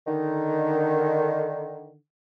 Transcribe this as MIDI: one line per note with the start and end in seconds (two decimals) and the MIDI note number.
0.07 1.97 50
0.07 1.97 51